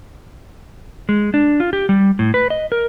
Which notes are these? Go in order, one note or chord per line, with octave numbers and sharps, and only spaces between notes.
G#3
D4
F4
G4
G3
A2
B4
D#5
A#4